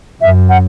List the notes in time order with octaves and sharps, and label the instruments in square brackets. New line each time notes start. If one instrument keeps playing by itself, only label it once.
[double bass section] F#2 [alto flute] E5
[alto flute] F#5